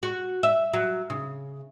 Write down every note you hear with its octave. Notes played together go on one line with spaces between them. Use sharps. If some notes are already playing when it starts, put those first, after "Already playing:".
F#4
E5
F#3
C#3